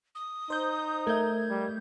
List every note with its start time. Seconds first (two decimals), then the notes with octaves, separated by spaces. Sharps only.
0.15 D#6
0.50 D#4 C5 G6
1.07 A3 A#4 E5 G6 G#6
1.49 G3